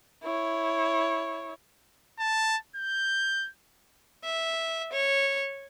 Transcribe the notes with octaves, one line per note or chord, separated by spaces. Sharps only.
E4 C#5
A5
G6
E5
C#5